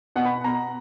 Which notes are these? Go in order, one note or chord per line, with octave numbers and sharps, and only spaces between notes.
B2 F#5
B5
B2 A#5